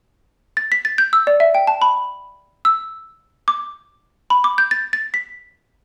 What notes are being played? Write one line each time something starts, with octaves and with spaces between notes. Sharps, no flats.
A6
B6
A6
G6
E6
D5
E5
G5
A5
B5
E6
D6
B5
D6
G6
A6
A6
B6